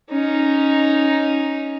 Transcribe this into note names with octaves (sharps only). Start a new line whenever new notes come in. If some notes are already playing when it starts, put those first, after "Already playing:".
C#4 D#4